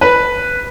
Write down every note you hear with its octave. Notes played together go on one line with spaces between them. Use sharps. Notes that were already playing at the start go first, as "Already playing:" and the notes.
B4